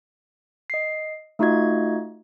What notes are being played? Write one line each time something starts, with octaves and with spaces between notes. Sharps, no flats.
D#5 C7
A3 D#4 F4 F#4 D#5 G#6